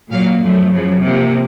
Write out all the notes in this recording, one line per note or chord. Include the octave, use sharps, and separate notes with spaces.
A#2 F#3 A#3 F5
F#2 F3 A3
F#2 C#3 F3
C3 F3 A#3